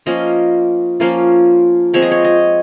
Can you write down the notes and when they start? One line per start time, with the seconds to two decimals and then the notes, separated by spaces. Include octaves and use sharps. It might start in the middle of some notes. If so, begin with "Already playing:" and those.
0.06 F3 A#3 C#4 F4 D#5
1.00 F3 A#3 C#4 F4
1.94 F3 G#3 C4 C#5
2.02 D#5
2.11 C#5
2.24 D#5